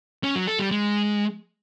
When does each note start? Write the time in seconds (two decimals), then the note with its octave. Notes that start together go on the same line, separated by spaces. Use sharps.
0.23 C#4
0.35 F#3
0.47 A4
0.59 G3
0.71 G#3